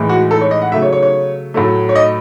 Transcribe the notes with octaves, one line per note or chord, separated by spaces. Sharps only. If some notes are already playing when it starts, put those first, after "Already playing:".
Already playing: A2 E3 G#3
F#4
A4
C#5
D#5
F#5
C#3 F#3 A3 E5
C#5
C#5
C#5
A2 F#3 A3
C#5
D#5